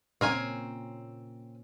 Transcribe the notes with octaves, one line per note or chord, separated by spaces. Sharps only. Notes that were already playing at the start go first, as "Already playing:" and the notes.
A#2 C4 C#4 A#4 G#5